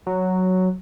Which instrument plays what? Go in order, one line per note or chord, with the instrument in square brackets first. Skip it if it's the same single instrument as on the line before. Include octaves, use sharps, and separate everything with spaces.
[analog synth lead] F#3